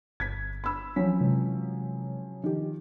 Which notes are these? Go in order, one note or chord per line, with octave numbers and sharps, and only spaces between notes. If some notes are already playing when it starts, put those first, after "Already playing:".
G1 G#6 B6
B5 E6
F3 F#3 C#4 B6
C3 E3 G#3
D#3 F3 G4